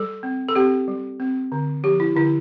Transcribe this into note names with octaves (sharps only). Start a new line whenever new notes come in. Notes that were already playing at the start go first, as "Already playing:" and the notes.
Already playing: G3 A4
C4
A4
C4 G4
G3
C4
D3
F3 G4
E4
D3 E4